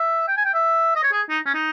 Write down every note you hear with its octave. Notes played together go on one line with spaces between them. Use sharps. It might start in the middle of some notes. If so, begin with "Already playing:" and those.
Already playing: E5
G5
G#5
G5
E5
D#5
C#5
G#4
D#4
C#4
D#4